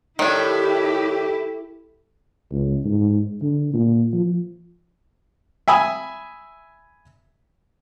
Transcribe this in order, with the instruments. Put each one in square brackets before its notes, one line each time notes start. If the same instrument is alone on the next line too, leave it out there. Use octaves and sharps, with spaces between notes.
[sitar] A2 [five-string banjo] D#3 D4 [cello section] E4 G4
[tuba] C#2
G#2
D3
A#2
F3
[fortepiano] E5 G#5 B5 D#6